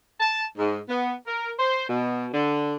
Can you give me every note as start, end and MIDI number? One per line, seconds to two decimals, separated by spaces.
0.20 0.45 81
0.58 0.79 44
0.89 1.14 59
1.27 1.52 70
1.59 1.87 72
1.89 2.28 47
2.33 2.76 50